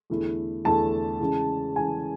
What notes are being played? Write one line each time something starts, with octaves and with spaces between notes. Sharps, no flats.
E2 D3 A3 E4
E2 D3 A3 E4 A5
C#3 E3 G#3
C#3 E3 G#3 G#5